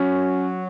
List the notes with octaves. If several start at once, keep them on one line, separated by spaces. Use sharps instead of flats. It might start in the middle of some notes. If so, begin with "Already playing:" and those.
Already playing: F#3 C#4